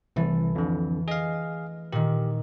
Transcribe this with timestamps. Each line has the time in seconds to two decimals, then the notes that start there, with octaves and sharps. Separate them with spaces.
0.16 C2 E3 A3
0.55 F2 D3
1.08 G#4 D#5 F5
1.92 A#2 D#3 G4